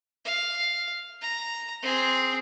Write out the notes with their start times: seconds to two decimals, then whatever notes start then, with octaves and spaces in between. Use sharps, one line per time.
0.25 F5
1.21 A#5
1.82 C4 G#4